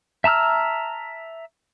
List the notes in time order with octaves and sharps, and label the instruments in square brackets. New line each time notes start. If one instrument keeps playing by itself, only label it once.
[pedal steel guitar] E5 A5 A#5 E6 F6